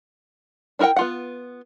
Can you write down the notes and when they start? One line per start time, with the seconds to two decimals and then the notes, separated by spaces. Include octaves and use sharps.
0.79 D4 E4 A#4 F#5 G5
0.96 B3 F4 F#5